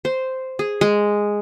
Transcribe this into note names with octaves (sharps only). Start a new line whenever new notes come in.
C5
G#4
G#3